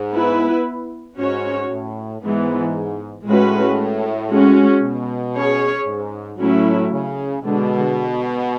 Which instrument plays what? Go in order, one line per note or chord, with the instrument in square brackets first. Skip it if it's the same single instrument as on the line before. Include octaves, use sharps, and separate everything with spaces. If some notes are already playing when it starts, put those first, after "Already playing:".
Already playing: [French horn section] G#2
[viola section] B3 E4 B4
[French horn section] G#2 [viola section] C#4 F#4 C#5
[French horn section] A2
[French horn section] G#2 [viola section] E3 G#3 B3
[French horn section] A2 [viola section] G#3 C#4 F#4 B4
[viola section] G#3 C#4 F#4
[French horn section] B2
[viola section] C#4 G#4 C#5
[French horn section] G#2
[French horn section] A2 [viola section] F#3 A3 C#4 E4
[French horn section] C#3
[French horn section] B2 [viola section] D3 G#3 D4